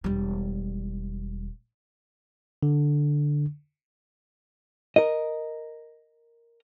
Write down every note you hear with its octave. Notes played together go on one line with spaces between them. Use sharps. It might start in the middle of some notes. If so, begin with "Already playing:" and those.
E1 G3
D3
A#4 D#5